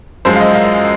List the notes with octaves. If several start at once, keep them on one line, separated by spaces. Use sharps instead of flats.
F#2 F3 G#3 C5
F5
D#5
F5